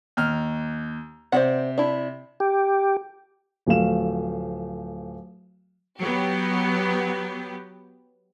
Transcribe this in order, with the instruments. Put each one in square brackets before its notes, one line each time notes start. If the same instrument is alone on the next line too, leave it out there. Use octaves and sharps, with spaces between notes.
[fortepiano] D#2 F6
[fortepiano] C3 [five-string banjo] C5 D5 F#5
[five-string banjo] D4 E4
[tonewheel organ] G4
[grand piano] D1 F3 A3 F5 E7
[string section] F#3 B3 G4